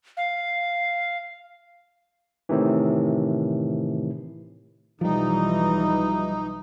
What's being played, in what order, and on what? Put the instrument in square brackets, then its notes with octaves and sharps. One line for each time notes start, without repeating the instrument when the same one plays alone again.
[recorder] F5
[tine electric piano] A2 C3 D#3 E3
[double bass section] B1 E3 [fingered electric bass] F3 G3 [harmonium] D#4